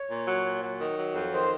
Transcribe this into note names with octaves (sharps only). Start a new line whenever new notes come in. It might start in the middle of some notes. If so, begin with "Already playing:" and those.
Already playing: C#5
A#2
F#3
A#2
F#3
D#3
F#3
F2
D#3 C5